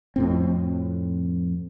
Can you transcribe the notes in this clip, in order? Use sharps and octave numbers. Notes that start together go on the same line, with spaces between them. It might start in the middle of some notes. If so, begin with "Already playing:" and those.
F2 A2 C4